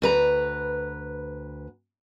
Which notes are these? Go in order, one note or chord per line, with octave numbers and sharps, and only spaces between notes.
D2 B4 A#5